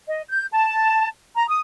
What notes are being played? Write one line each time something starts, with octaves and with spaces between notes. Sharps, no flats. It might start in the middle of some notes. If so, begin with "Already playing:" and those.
D#5
G6
A5
A#5
D#6